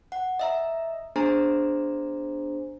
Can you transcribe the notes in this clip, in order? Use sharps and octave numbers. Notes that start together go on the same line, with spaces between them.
F#5
D#5 E5 A#5
B3 D4 G#4 C5 G#5 A#5